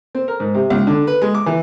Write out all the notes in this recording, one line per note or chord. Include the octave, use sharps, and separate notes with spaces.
C4
A#4
G#2
C3
C#2
D3
B4
G#3
D6
E3